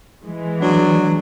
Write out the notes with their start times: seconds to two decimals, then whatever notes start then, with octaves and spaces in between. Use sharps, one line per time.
0.25 E3 G#3
0.60 F#3 B3 D4